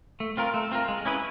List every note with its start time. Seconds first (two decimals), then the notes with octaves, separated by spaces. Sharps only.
0.20 A3
0.37 C4 F4 A#4
0.54 A3
0.71 C4 F4 A#4
0.88 G#3
1.05 C#4 E4 G#4 B4